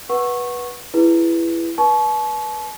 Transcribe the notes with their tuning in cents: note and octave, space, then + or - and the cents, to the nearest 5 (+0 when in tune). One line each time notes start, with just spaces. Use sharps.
B4 -15 F#5 +0 C#6 -15
E4 +20 G#4 +0 B4 +0
B4 -25 A5 -40 C#6 +0